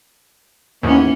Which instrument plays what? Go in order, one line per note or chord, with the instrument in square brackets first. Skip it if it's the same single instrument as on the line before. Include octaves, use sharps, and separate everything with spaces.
[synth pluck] D#2 G#2 [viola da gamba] E3 B3 C#4